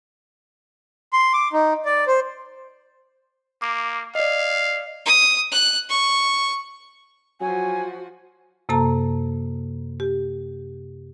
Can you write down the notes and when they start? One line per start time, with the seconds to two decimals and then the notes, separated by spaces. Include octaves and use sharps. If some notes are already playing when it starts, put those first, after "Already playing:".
1.13 C6
1.33 D6
1.53 D#4
1.85 D5
2.07 C5
3.62 A#3 D6
4.15 D5 D#5 F5
5.06 D#6
5.51 F#6
5.89 C#6
7.41 F3 F#3 F#4 G#5
8.69 F#2 C3 A#3 A4 A5 A#5
10.00 G4